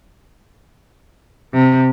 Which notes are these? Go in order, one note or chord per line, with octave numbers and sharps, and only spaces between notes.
C3